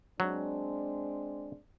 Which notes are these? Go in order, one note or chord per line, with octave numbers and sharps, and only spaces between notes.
F#3 G#3 C4 D4